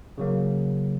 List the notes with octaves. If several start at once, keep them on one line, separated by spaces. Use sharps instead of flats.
C#3 F#3 A#3